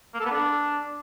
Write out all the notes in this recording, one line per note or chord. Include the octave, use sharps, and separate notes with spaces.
A#3
A4
B3
D4